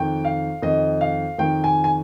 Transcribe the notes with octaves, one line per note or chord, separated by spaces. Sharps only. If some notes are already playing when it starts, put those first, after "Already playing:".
Already playing: F2 D#3 G5
F5
F2 D#3 D#5
F5
F2 D#3 G5
G#5
G#5